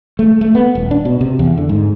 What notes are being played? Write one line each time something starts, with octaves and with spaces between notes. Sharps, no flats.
A3
A3
B3
D#1
D4
B2
C3
E2
D3
G#2